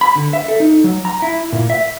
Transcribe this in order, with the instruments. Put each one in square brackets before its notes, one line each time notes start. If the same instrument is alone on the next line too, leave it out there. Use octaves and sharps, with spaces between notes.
[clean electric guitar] B5
D3
E5
A4
D#4
F#3
A#5
E4
A#2
E5